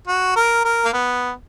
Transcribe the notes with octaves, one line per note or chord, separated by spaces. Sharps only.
F#4
A#4
A#4
A#3
B3